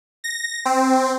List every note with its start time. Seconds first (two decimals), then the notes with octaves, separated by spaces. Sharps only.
0.24 A#6
0.65 C4